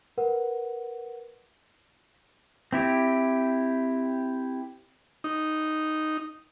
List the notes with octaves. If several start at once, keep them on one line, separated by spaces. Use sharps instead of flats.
A#4 B4 F#5
C4 E4 G4
D#4